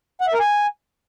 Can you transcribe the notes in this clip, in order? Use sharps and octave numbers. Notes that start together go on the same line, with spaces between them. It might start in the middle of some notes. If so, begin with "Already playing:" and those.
F#5
E5
A#4
G#5